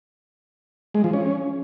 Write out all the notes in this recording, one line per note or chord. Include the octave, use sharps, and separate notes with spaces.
G#3
F3
C#4